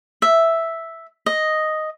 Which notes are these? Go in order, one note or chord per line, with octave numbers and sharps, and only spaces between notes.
E5
D#5